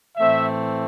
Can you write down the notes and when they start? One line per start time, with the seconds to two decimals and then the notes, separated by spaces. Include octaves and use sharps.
0.16 A2 E3 A3 C4 E5